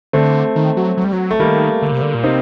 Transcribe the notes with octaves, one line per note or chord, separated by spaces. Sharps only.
D3 A3 C4
D#3
F#3
F#3
G3
F#3
A3
D#3 G3 A#3
D3
C3
D3
A#2
C3 C4 D#4